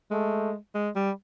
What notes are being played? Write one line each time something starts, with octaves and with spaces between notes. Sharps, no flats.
G#3 A3
G#3
G3